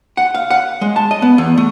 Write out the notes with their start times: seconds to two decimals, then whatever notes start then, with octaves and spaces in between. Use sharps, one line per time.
0.17 F#5
0.35 F5
0.50 F#5
0.81 G#3
0.96 A5
1.11 D#5
1.22 B3
1.38 E2
1.57 A3